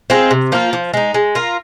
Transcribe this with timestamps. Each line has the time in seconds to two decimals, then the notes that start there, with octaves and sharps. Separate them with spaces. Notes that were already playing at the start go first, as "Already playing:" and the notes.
0.10 G#3 C4 F4
0.31 C3
0.52 F3 A#3 F4
0.73 F3
0.94 G#3 D#4
1.14 G#3
1.35 F4 A#4